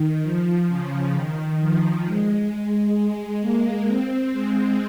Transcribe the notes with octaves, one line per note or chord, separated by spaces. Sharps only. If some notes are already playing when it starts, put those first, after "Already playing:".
Already playing: D#3
F3
C#3
D#3
F3
G#3
G#3
A#3
C4
G#3